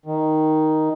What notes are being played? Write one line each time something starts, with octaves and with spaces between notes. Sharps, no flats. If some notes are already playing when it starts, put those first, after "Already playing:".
D#3